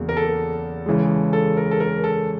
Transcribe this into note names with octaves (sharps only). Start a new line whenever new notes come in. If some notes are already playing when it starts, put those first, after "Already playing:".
Already playing: E2 C#3 F#3 A#3
A#4
A4
C#3 E3 G#3
A4
A#4
A4
A#4
A4